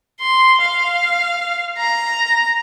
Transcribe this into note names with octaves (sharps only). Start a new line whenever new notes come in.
C6
F5
A#5